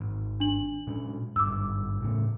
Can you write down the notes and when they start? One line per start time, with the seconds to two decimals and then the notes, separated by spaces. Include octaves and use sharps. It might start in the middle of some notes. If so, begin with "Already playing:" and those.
0.01 G#1
0.40 D4 F#7
0.87 A#2 G#3 C#4
1.36 G#1 G2 D6 E6
2.01 A2 C#3 A3